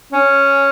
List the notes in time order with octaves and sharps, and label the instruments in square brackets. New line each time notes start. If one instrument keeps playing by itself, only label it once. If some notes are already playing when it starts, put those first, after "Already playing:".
[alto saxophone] C#4